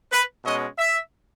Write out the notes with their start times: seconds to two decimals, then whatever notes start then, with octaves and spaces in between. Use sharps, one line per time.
0.13 B4
0.45 B2 G#3 C#4 D#5
0.78 E5